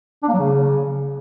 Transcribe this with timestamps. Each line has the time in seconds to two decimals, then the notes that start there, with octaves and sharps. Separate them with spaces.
0.23 D4
0.28 A#3
0.34 F#3
0.39 C#3